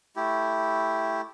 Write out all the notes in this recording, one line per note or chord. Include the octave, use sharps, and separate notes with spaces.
A3 E4 G4